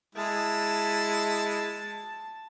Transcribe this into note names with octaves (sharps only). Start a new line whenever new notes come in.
G#3 E4 A5